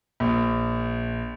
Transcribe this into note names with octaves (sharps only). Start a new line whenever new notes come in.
A#1